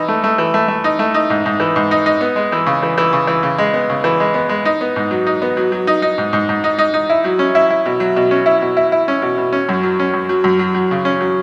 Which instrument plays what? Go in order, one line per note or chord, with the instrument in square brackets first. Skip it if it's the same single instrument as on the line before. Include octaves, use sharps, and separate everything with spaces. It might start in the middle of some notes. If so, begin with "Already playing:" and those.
Already playing: [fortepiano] E3 D#4
A3
A3
E3
A3
A3
D#4
A3
D#4
G#2
G#2
E3
G#2
D#4
D#4
B3
G#3
E3
C#3
E3
E3
C#3
E3
C#3
G#3
B3
C#3
E3
G#3
B3
G#3
D#4
B3
G#2
F#3
D#4
B3
F#3
F#3
D#4
D#4
G#2
G#2
G#2
D#4
D#4
D#4
E4
F#3
C#4
E4
E4
B2
F#3
B2
C#4
E4
B2
E4
E4
C#4
B2
B2
C#4
F#2
F#3
C#4
F#2
F#3
F#2
F#3
F#3
C#3
C#4
F#3